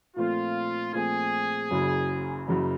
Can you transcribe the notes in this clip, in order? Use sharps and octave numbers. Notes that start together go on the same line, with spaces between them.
A#2 F3 A3 C4 F4
A#2 F3 A3 C4 G#4
F#1 F#2 C#3 F#3
F#1 F#2 C#3 F#3